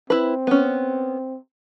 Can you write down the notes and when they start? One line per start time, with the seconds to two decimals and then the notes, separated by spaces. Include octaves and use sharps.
0.10 C4 E4 B4
0.47 B3 C#4